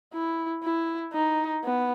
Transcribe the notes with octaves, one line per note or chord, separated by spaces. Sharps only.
E4
E4
D#4
B3